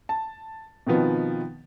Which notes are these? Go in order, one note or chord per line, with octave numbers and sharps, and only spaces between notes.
A5
B2 D#3 F3 B3 C4